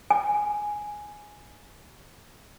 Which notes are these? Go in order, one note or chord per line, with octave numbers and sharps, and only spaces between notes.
G#5